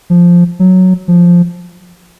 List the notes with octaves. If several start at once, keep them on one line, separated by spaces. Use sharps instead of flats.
F3
F#3
F3